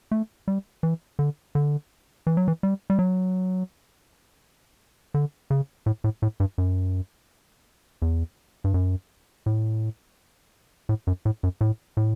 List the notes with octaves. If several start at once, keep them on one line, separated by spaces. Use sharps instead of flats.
A3
G3
E3
D3
D3
E3
F#3
E3
G3
G3
F#3
D3
C#3
A2
A2
A2
G2
F#2
E2
G2
F#2
A2
A2
F#2
A2
F#2
A2
A2